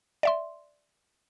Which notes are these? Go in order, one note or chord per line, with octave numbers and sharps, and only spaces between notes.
D5 E5 C6